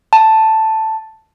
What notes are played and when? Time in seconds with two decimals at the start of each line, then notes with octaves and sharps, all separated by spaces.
0.13 A5